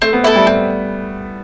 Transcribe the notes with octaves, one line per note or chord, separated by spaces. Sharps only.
A3 C4
B3
A3 E4 A4
G3
G3 C4